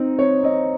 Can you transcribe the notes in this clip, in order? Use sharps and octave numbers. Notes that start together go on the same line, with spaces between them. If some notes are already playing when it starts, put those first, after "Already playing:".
Already playing: C4 D#4
C4 C#5
C4 D#5